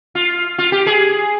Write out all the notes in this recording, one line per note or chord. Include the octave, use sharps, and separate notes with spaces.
F4
F4
G4
G#4